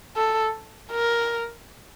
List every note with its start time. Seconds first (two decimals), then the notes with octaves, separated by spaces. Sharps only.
0.17 A4
0.92 A#4